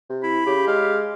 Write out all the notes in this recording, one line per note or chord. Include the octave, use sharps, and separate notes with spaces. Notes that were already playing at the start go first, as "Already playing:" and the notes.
C3
E4 B5
C#3 G4
G#3 F5